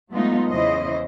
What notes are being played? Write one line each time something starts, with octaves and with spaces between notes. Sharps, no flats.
F#3 G#3 A3 B3 D#4 F4
E2 C#3 E3 E4 C5 D#5